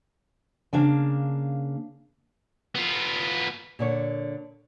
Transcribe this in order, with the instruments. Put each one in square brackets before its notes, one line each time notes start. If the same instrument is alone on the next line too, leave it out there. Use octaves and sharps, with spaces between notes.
[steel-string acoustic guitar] C#3 A#3 D4 F5
[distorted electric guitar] B3 F4
[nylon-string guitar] A#2 D3 C#5